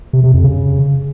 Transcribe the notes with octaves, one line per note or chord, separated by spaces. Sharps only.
C3
C3
F2
C#3